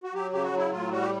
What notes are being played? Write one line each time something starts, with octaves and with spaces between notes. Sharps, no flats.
F#4
F#3 G4
C#3 G4
F#4
F#3
E4
A2 F4
G3 F#4
G4